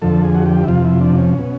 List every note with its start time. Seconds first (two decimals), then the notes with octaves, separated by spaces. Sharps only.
0.02 F2 D3 F3 A4
0.24 G#4
0.35 F#4
0.46 G4
0.64 E4
0.68 F2 C3 F3 F4
0.85 E4
1.01 D4
1.17 C#4
1.38 B2